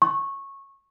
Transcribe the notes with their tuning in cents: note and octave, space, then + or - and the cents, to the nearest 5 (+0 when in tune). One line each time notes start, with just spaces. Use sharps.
C#6 -15